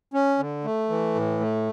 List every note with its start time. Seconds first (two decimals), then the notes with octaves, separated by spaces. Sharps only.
0.14 C#4
0.39 D3
0.64 A3
0.90 E3
1.15 A2
1.40 A3